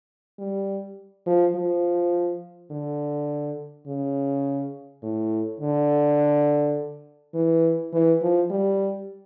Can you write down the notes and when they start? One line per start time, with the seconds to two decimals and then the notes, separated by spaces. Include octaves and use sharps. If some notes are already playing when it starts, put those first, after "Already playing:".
0.39 G3
1.26 F3
1.55 F3
2.71 D3
3.87 C#3
5.03 A2
5.60 D3
7.34 E3
7.93 E3
8.22 F3
8.50 G3